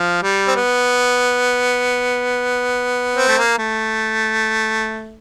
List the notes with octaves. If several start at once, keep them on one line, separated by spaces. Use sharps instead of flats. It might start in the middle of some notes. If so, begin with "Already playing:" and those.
Already playing: F3
G3
C4
B3
C4
A3
A#3
A3